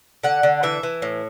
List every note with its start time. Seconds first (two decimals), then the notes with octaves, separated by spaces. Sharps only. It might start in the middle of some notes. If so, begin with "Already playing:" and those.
0.24 D3 F#5
0.43 D3
0.63 E3 E5
0.83 E3
1.02 A2